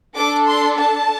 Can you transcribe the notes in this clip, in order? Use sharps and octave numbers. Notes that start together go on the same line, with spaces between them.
D4 A4 D6
C6
A5